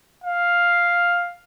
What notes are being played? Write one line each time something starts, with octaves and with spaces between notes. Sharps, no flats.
F5